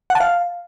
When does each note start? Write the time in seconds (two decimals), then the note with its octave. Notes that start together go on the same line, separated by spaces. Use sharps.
0.10 F#5
0.15 A5
0.20 F5